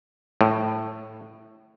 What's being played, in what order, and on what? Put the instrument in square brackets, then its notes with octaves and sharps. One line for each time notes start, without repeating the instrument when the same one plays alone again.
[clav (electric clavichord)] A2